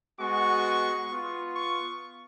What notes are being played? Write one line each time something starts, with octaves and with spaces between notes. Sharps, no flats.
G#3 B3 F#4 C#6
B3 F4
C#6